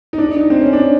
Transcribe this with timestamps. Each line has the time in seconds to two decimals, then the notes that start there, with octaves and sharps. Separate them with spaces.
0.13 D#4
0.18 D4
0.36 D#4
0.50 C4
0.61 C#4
0.73 D4